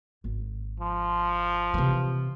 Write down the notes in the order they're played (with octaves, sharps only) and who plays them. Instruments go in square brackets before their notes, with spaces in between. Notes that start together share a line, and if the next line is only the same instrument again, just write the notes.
[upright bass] G#1
[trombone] F3
[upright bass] C3 E3